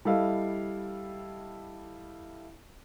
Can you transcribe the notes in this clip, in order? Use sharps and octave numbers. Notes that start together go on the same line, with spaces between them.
G3 E4 A4 D#5 F5